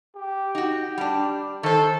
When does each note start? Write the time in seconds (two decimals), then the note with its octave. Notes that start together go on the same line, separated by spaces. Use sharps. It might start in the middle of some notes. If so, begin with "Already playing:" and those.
0.16 G4
0.55 D#4 F#4
0.98 G3 D4
1.63 D#3 A4 C5